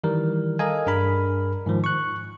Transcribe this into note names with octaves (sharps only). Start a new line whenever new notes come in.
D#3 E3 G3 A#4
A4 A#4 D#5 F5 G#5
G2 D4 G#4 A#4 B5
G#2 D#3 F3
C#6 F#6